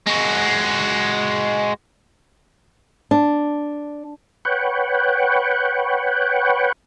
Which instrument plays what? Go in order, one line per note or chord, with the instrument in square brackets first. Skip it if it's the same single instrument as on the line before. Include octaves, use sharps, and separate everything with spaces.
[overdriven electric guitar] G#3 F#4
[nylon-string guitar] D4
[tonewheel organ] B4 C#5 F#5 G5